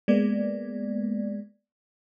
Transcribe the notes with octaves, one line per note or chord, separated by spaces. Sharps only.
G#3 A#3 B3 D5